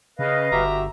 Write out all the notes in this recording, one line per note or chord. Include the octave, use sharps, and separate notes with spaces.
C#3 B4 D#5 F5
G1 F#4 G4 E5 A#5